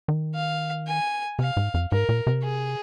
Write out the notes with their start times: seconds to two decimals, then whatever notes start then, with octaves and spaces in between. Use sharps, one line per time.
0.08 D#3
0.35 F5
0.87 G#5
1.39 C3 F5
1.57 G#2
1.74 F2
1.92 G#2 A#4
2.09 A#2
2.27 C3
2.44 G#4